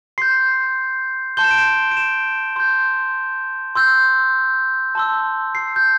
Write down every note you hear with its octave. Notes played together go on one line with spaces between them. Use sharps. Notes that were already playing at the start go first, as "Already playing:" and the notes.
C6 G6 C7
A5 C6 G6 G7
E7
D7
E7
D7
E7
C6 G6
C6 E6 G6
A5 C6 E6
C7
G6